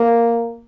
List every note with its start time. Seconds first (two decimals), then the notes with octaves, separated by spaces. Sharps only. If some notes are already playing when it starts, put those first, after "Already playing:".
Already playing: A#3